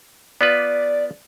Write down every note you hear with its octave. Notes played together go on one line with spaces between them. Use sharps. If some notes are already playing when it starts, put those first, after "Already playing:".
B3 F4 B4 D5